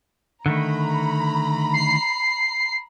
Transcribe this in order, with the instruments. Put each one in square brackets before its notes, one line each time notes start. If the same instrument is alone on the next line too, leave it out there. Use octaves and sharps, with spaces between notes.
[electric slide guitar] D3 D#3 A3 [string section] A#5 B5
[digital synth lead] C7